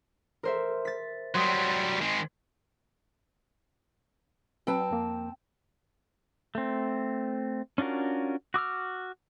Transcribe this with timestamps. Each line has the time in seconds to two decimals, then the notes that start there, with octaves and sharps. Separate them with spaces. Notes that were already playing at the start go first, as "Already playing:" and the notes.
0.43 A#4 C5 E5
0.85 A6 B6
1.35 F#3 G3 C6 D#6
2.01 D#3 G#3
4.67 F#3 C4 B4 G5 A5
4.91 F2 A#3
6.55 A3 C4
7.78 C#4 D4 F4 F#4 A#4
8.54 F#4 D6 E6 F6